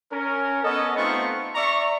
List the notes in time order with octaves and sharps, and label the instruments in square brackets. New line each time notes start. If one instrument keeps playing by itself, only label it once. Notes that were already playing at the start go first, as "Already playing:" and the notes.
[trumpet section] C#4 A#4
B3 C#4 A4 D#5
A3 B3 C4 D#4 F4 C#6
D5 E5 A#5 C#6